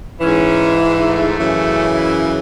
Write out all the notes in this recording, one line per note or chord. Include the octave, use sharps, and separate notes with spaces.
G#2 E3 C#4
A3
F#2 C#3 E3
E4